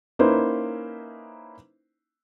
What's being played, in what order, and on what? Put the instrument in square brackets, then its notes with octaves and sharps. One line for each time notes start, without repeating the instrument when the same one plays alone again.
[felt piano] A#3 C#4 D#4 E4 B4 C5